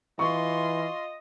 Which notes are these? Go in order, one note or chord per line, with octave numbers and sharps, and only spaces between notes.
E3 F4 D#5 C6 C#6